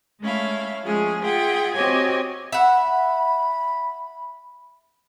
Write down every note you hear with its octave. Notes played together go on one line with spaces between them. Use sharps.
G#3 A3 C#4 E4 F5
F3 G#3 A3 C#4 G#4
F4 G#4 E5 F#5 G5
C4 F#4 G4 C#5 D#5 G#5
E5 F#5 B5